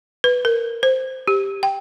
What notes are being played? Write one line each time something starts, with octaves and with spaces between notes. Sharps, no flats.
B4
A#4
C5
G4
G5